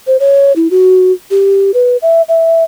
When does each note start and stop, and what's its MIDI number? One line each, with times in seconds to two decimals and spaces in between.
0.07 0.17 72
0.20 0.53 73
0.56 0.68 64
0.71 1.12 66
1.31 1.71 67
1.74 1.97 71
2.02 2.22 76
2.28 2.64 76